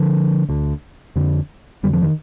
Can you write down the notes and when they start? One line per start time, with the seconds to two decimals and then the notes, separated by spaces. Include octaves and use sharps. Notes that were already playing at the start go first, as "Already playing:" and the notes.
Already playing: D3 F3
0.49 D2 D3
1.16 F2 D3
1.83 F2 D3 G3
1.93 F3
2.02 D#3